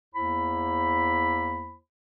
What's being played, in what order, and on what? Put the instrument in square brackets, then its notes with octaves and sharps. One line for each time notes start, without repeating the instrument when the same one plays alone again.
[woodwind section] E2 A#3 E4 C5 B5